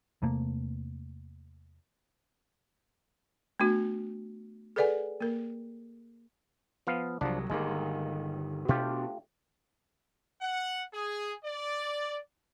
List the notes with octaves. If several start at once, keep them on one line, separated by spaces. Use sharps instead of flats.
E2 C3 A3 A#3
A3 B3 D4 F#4
G#4 A4 B4 D5 F#5 G#5
A#3 A#4
F3 B3 F5
C2 F3 F#3 D4
G1 D#3 G#3 A#3
B2 A3 D4 F4 G4
F#5
G#4
D5